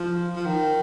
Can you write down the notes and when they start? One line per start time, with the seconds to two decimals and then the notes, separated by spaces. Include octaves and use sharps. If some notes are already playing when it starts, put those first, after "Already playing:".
Already playing: F3
0.36 F3
0.46 D#3